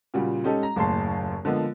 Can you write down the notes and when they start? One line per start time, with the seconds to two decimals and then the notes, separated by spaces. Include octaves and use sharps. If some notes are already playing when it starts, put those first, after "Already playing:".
0.14 A#2 C#3 G3 F#4
0.44 G#3 C#4 D#4 G4 A4
0.63 A#5
0.76 F#1 D#2 A2 A5 C6 C7
1.45 D3 F3 G#3 A#3 B3